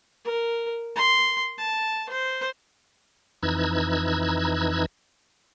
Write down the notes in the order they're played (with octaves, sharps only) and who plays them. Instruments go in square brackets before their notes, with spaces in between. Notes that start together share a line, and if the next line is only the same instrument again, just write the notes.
[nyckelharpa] A#4
C6
A5
C5
[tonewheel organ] F2 E3 D#4 E6 F#6 G#6